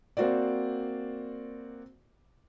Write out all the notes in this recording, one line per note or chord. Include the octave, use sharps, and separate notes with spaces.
A#3 C4 F#4 C5 D5